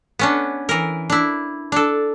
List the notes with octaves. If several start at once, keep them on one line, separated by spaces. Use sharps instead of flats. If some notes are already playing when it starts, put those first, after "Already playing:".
B3 C#4 D4
E3 A#4
D4 E4
D4 A4